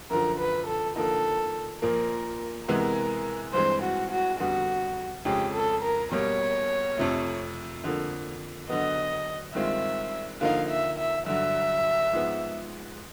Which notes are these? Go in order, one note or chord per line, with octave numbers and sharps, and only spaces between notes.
F#2 D3 F3 A#4
B4
A4
D3 F3 A#3 D#4 A4
A#2 F3 A#3 A#4
C3 E3 G#3 B3 A#4
G2 E3 G#3 C4 C5
F#4
F#4
F2 D3 G3 B3 F#4
F2 C#3 F3 G#3 C#4 G4
A4
A#4
B2 G3 A#3 C#5
F2 C3 F3 A3
F2 D3 F3 A#3
D3 F#3 B3 D#5
G2 D#3 G#3 C4 F4 E5
D3 F3 A#3 D#4 F5
E5
E5
G2 D3 F#3 E5
G#2 F3 G#3 B3